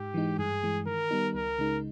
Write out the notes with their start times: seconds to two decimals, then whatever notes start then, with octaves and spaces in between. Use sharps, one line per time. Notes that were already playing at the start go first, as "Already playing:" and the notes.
Already playing: G#2 G4
0.14 E3 G#3 D#4
0.39 G2 G#4
0.63 E3 G#3
0.86 D#3 A#4
1.11 G3 B3 D#4
1.34 C#2 A#4
1.59 C#3 G#3 D#4